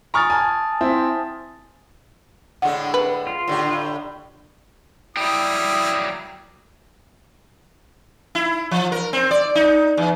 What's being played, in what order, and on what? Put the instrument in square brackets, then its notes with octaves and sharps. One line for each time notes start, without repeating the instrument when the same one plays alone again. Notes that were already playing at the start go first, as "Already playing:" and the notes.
[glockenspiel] G#5 D#6 A6 [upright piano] A#5 C#6 F6
[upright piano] G#5 [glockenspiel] A5
[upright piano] C4 E4 E5
[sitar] A2 D3 G#3 [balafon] F#5
[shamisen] B4
[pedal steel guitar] F4
[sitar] A2 D3 G4
[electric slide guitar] F#3 D5 G5 [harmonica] E4 D#6
[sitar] E4
F3
A#4
C4
D5
D#4
E2